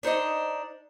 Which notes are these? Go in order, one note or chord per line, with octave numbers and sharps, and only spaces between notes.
D4 D#4 C5 D#5